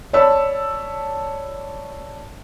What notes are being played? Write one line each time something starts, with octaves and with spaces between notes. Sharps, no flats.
C#5 D5 A5 B5 E6